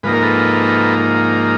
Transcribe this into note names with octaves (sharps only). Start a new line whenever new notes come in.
G#2 F3 A#3 D#4 B4
A#4
A4 B4